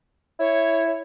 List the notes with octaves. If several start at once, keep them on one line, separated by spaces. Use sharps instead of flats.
E4 C#5